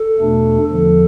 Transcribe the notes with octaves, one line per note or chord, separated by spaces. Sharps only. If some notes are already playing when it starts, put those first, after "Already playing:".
Already playing: A4
E2 B2 A3 D4
E2 D3 F3 A4